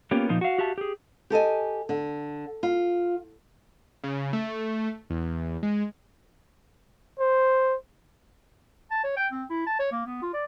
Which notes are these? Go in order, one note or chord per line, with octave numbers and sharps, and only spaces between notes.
A#3 B3 C#4 F4 G4
A#2 F3 D#4 F4
F#4 F5
F#4 G4 E5 F5 A5
G4 G#4
G4 A4 D#5 G#5
D3
F4
C#3
A3
E2
G#3
C5
A5
C#5
G5
C4
E4
A5
C#5
A#3
B3
F4
D5